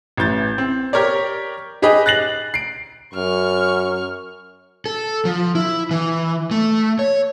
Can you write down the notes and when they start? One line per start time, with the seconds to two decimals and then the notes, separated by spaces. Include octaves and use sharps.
0.17 A1 E3 G6 A6
0.58 C4
0.93 G4 A#4 C#5 D5
1.82 D#4 G4 G#4 B4 D#5
2.06 F#6 A6 A#6 C7 F#7
2.54 C7 D7
3.14 F#2 C#6 F6
4.86 A4
5.25 F3
5.55 E4
5.91 E3
6.51 A3
6.99 C#5